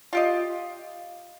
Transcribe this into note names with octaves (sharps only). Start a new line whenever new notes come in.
F4 G4 D#5